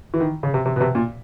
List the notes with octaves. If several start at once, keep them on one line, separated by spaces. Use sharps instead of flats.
E3
D#3
C#3
C3
C3
B2
C3
A#2